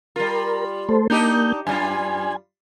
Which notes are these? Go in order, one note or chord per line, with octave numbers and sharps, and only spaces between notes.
G3 F4 A#4
A3 A4 C5
A#3 D4 D#4 G4 G6
F#2 G3 F4 G#5